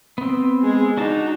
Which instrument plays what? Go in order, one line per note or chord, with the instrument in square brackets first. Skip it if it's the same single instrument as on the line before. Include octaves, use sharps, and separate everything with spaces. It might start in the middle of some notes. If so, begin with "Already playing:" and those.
[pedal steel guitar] B3 C4
[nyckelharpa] G#3 G#4
[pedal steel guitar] D4 F#4 A5 [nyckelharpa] D#4